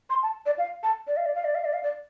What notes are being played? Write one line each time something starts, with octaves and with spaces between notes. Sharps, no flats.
C6
A5
D5
F5
A5
D5
F5
D5
F5
D5
F5
D5
F5
D5